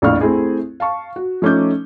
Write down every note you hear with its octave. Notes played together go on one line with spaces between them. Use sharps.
A#1 F2 A2 F5 C#6 F6
A3 C4 E4 G#4
F5 A5 C#6
F#4
F3 A3 C#4 D#4 D6 G6